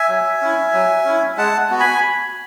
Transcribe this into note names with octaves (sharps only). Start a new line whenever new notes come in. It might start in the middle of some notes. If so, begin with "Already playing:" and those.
Already playing: E5 G#5
F#3
C#4 E4
F#3
C#4 E4
G#3 F#5 A5
B3 F#4
G#5 B5